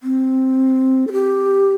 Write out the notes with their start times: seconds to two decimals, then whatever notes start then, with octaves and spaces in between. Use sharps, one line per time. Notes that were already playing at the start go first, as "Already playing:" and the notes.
0.03 C4
1.07 A4
1.12 G4